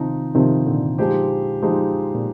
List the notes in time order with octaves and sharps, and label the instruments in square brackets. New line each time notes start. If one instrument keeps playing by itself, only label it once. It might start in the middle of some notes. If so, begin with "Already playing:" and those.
Already playing: [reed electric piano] C3 D#3 [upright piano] F3 C4 D#4
[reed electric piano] C3 D#3 [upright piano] F3 C4 D#4
[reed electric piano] A#2 D3
[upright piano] F3 G#3 D#4 G4 C5
F3 G#3 D#4 G4 C5
[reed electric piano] A#2